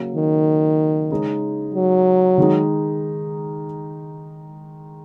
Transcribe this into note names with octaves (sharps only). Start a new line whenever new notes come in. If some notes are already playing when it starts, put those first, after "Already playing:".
Already playing: C#3 F#3 A#3 C#4
D#3
C#3 G#3 D#4 G#4
F#3
D#3 G#3 D#4